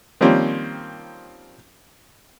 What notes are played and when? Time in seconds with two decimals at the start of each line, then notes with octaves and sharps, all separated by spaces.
0.21 D#3 F3 G3 A#3 C4 C#4